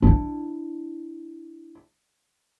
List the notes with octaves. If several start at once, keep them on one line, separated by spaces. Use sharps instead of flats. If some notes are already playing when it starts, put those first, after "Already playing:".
D4 E4